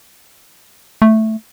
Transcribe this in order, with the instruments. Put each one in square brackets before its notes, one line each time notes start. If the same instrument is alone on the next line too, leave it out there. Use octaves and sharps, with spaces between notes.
[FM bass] A3